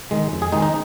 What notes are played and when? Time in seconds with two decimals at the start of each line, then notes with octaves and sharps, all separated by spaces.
0.11 D#3 G#3
0.32 F2
0.42 G#4
0.52 D#3 G#3 D#4
0.62 D#4